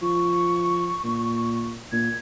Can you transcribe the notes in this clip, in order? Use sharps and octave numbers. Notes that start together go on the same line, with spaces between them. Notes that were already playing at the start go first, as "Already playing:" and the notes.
F3 C#6
A#2
A#2 G#6